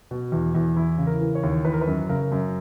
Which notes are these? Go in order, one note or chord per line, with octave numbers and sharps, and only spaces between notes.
B2
E2
E2
E3 E4
C#3
A#4
E3
C#5
D#2
E3 B4
A#4
B4
F#2
C#3 A#4
F#2